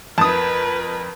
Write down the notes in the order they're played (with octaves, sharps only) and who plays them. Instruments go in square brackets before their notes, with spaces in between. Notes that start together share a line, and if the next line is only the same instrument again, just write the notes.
[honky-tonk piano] F2 [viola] A#4 B4 [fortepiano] A5 D#6